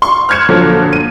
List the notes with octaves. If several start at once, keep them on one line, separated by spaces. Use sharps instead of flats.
C6 C#6
F6 F#6 G#6 C#7 E7
A#2 D3 F3 F#3
D#7